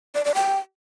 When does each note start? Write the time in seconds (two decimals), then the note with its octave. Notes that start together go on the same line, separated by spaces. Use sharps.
0.15 D5
0.25 D5
0.35 G5